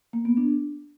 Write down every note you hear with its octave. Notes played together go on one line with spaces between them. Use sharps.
A#3
B3
D4